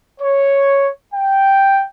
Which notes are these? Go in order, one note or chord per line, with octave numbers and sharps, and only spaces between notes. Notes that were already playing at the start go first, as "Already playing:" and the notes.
C#5
G5